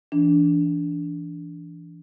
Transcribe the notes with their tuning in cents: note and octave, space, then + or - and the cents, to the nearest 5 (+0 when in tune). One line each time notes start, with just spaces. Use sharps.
E3 +15 D4 -15